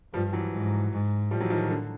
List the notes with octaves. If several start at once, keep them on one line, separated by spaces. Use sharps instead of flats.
G2 F3 G3
E3 F#3
G#2
G#2
A2 F3 G3
E3 F#3
D#3 F3
D3